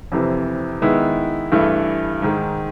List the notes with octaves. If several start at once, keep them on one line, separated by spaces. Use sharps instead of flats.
F2 C3 E3
D#3 G#3 B3 E4
G2 E3 A3
G#2 D#3 G#3